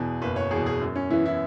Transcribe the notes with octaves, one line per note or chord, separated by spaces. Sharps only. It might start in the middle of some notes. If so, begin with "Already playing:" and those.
Already playing: E2 B2 G#4
F#1 B4
C#5
E2 B2 G#4
G#4
F#2
C#4
E3 B3 E4
E4